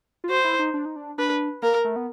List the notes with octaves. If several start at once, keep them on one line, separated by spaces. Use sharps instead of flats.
F4
F#4 C5
E4
D#4
D4
D#4
D4
D4 B4
A#3 A#4
A3
B3